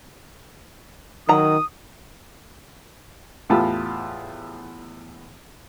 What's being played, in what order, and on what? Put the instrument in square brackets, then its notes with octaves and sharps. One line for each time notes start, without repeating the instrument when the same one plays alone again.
[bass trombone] D#3 [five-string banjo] F#3 A#5 [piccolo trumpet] D#6
[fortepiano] E2 A2 F4 G4 A5 B5